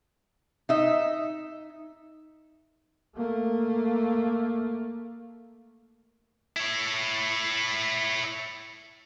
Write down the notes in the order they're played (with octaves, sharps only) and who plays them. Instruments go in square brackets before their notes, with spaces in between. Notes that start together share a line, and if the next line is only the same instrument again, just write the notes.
[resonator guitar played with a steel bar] D#4 E5
[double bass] A3 A#3
[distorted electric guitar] E4 C#5